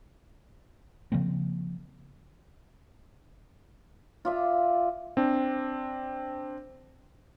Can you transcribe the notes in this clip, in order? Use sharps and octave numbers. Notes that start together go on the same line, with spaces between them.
C#3 F3 A#3 C4
F4 D5 E5
C4 D4